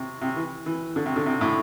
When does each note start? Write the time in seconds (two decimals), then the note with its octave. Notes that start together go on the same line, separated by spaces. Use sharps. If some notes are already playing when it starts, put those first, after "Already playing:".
Already playing: C3
0.21 C3
0.36 E3
0.66 E3
0.96 D3
1.06 C3
1.16 D3
1.26 C3
1.41 A2